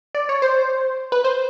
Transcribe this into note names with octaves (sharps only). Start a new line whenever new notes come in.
D5
C#5
C5
B4
C5